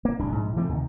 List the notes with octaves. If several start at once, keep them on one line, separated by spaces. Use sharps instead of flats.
A#3
D1 C2 D4
A#1 G#2
E3 F3 A3 C4
D2 C3 D#3